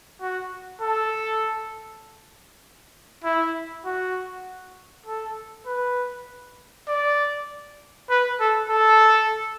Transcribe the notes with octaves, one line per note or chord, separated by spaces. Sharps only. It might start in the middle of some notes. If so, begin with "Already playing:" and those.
F#4
A4
E4
F#4
A4
B4
D5
B4
A4
A4